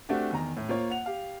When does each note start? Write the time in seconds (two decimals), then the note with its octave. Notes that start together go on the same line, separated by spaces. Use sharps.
0.09 A3 C4 D4 F#4 G4
0.30 E2 D#3 A#5
0.57 A2
0.68 A#3 F4 C5 C#5
0.90 F#5 F7
1.06 G4 F5